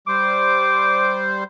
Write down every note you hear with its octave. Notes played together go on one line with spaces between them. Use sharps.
G3 C5 D6